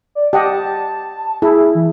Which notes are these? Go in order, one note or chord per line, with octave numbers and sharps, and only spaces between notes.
D5
G4 D#5 F#5 A5
E4 G#4
E3